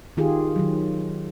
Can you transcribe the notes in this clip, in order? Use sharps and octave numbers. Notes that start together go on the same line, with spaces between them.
D#3 F4 G4 G#4
D#3 F#3